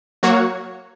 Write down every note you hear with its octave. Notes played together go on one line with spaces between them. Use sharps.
F#3 A#3 F#4 C#5